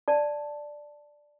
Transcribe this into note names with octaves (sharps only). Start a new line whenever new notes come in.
D5 A5